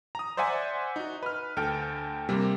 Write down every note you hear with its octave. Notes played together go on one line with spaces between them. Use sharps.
A#5 D#6
C5 D5 E5 F#5 G#5
D#4 F#4
B4 F6
D2 A4 G5 F6
C3 G3 A#3